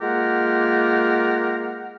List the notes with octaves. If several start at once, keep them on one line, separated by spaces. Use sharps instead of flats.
G#3 A#3 F4 G4 A#4 F#5